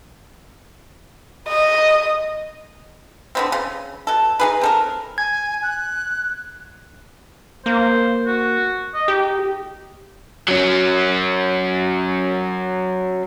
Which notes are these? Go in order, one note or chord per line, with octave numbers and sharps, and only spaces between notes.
D#5
D3 B3 C4
C#3
B2 A4
D#4 G#4 B4
C4 A4 A#4
G#5 G#6
F#6
A#3 C5
F#4
D#5
D#4 G4
F#3 C#4